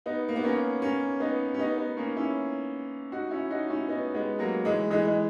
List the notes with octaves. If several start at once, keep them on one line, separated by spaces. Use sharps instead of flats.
B3 D#4
A#3
B3
A#3 C#4
A#3 C#4
B3 D#4
C#4
B3 D#4
B3 D#4
A#3 C#4
C#4 E4
D#4 F#4
C#4 E4
D#4 F#4
C#4 E4
B3 D#4
G#3 B3
F#3 A#3
E3 G#3
E3 G#3
G#3